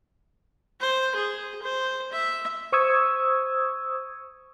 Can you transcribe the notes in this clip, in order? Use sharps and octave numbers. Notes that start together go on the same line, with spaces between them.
C5
G#4
C5
E5
C5 C#6 D#6 E6 G#6